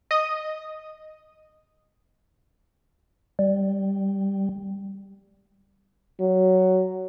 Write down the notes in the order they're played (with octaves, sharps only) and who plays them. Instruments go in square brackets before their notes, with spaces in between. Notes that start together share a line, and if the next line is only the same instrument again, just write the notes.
[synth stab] D#5 D#6
[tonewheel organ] G3
[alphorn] F#3